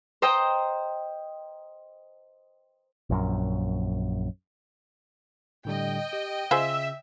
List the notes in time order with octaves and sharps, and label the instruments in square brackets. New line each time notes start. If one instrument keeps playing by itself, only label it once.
[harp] C5 D#5 G5 A#5
[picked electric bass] A#1 F#2
[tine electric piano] A2 D3 G3 [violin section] D#5 G5
[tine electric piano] G4
[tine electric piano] C#3 [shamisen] F4 G#4 C5 [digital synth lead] E5